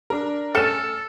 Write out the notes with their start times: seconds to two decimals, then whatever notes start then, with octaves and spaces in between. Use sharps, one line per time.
0.10 D4 A#4
0.55 A3 C#4 A4 F6 C#7 E7